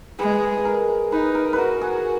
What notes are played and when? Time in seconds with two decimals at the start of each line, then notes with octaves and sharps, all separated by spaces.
0.19 G#3 B4
0.57 G#4
0.65 A#4
1.12 D#4 B4
1.35 A#4
1.53 B4
1.58 F#4 A#4
1.81 G#4